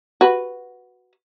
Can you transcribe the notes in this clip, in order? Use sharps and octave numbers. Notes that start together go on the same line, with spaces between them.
F#4 B4